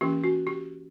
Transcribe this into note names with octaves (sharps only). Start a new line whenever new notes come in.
E3 A#3 C#4 G4
F#4
G4